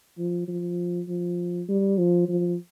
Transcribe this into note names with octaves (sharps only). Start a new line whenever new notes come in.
F3
F3
F3
G3
F3
F3